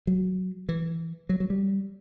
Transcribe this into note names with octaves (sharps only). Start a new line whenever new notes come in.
F#3
E3
F#3
F#3
G3